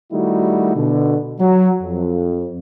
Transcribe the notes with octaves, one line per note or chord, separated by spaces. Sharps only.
D#3 G3 A3 D#4 E4 F#4
B2 D3
F#3
F2